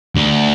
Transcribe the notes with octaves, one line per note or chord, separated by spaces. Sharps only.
D2